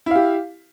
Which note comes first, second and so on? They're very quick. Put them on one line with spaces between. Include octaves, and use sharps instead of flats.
E4 F5 G4